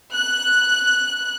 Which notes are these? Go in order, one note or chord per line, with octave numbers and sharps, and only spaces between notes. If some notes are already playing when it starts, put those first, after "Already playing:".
F#6